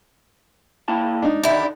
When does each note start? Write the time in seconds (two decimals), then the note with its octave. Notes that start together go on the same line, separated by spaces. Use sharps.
0.88 A#3 E4 A5
1.22 D4 D#4
1.43 D3 D#3 E4 G4 D5